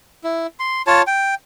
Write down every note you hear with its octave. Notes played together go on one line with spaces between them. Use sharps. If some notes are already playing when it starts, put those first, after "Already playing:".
E4
C6
F4 C#5 A5
G5